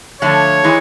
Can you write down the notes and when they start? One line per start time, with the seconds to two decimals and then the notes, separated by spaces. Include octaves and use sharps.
0.21 D3 F3 A3 D4 F4 C#5
0.64 E3 G#3